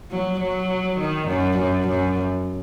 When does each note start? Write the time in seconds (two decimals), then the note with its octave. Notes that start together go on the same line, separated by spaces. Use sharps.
0.11 F#3
0.40 F#3
0.98 D#3
1.28 F#2
1.58 F#2
1.88 F#2